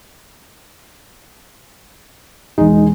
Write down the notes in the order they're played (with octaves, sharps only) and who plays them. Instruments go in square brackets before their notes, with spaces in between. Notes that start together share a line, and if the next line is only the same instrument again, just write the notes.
[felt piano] E1 G#3 [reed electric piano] D#4